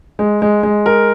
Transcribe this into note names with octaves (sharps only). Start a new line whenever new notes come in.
G#3
G#3
G#3
A#4